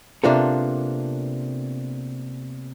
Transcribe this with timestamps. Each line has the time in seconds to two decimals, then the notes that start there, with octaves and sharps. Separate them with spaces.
0.24 C3 A#3 B3 D4 F4 A4